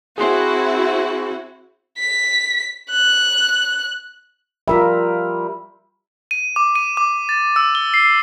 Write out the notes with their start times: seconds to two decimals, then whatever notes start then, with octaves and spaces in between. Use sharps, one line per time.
0.18 C4 E4 F#4 G#4 C6
1.99 B6
2.91 F#6
4.68 G3 F4 A#4 E5
6.31 D#7
6.56 D6
6.76 D#7
6.97 D6
7.29 A6
7.56 E6
7.75 G7
7.94 C7